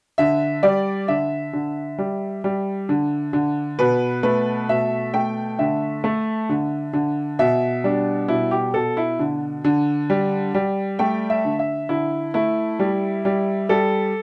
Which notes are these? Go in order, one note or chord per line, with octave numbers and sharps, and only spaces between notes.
D3 E5
G3 D5
D3 E5
D3
G3
G3
D3
D3
B2 B4
A3 B4
B2 E5
A3 G5
D3 E5
A3
D3
D3
B2 E5
G3 D4
B2 E4
G4
B2 A4
E4
D3
D3
G3
G3
A3 G5
E5
D3
E5
D3 E4
A3 E4
G3
G3
G3 A4